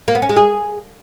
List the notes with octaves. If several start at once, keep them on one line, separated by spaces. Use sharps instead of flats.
A#3
B3
C#4
G#3
G#4